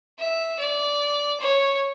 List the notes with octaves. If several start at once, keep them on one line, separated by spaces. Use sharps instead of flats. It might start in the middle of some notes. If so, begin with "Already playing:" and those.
E5
D5
C#5